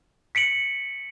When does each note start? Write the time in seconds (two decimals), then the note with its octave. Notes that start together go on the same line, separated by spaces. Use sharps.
0.35 B6 C#7 D7 F#7